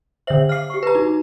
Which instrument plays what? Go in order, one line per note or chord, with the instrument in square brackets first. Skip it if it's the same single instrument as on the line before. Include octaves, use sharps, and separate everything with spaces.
[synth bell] D3 F#7 [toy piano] C5 E5 F#5
[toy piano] F5 D6 [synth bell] F6 C7
[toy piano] G4 C#6
[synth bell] B4 A#5
[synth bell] D#4 [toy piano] F#4